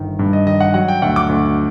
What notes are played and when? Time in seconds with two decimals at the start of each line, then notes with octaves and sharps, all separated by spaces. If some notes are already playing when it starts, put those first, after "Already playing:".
Already playing: G1 D#3
0.19 G2
0.33 D#5
0.47 D#3 D#5
0.60 F#5
0.74 F#3 F#5
0.88 G5
1.02 D2 F#5
1.16 D6
1.29 D2